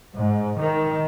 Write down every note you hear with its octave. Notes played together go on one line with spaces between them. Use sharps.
G#2
D#3